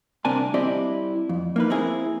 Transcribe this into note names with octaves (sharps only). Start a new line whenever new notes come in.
C2 C4 D4 A#4 G#5 A5
G3 C4 E4 G4 D5 D#5
F2
A#3 D#4 B4
A#3 C4 E4 G#4